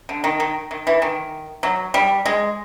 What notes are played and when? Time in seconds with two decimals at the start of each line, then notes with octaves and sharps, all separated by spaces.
0.09 D3
0.24 D#3
0.40 D#3
0.71 D#3
0.87 E3
1.02 D#3
1.63 F#3
1.94 G3
2.25 G#3